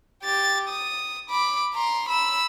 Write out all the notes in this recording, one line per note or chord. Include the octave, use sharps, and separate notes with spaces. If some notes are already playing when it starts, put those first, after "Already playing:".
G4 A6
D#6
B5 D6
A#5 C6
B5 E6